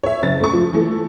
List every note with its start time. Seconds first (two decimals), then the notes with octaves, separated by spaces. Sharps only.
0.03 C#5 E5
0.23 F#1 A6
0.40 A3 C#6
0.53 F3
0.73 E3 A3